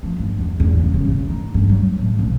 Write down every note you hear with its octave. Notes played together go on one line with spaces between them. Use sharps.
F3
G1
E2
E2
C#3
C#3
C#3
D#4
G2
F#3
A2
B1